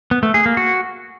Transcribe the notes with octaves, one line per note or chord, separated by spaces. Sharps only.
B3
A3
G#4
A#3
F#4